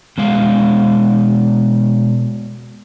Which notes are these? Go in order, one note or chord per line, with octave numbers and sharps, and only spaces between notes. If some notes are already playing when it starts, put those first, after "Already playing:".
B2 G#3 F5